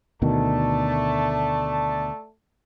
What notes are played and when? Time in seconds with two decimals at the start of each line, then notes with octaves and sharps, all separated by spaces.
0.22 D2 B2 D#3 A3 D5 A5